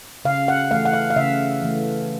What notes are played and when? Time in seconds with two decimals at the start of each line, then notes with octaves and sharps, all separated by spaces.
0.25 C#3 F5
0.48 F#5
0.71 E3 A3 F5
0.85 F#5
0.93 F5
1.10 F5
1.16 C#3 E5
1.62 E3 A3